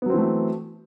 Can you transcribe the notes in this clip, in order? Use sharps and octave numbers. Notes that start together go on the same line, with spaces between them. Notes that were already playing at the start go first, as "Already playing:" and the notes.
E3 F#3 A3 B3 C4